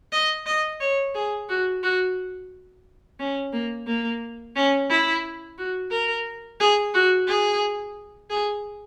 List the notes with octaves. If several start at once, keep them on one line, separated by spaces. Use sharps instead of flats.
D#5
D#5
C#5
G#4
F#4
F#4
C#4
A#3
A#3
C#4
E4
F#4
A#4
G#4
F#4
G#4
G#4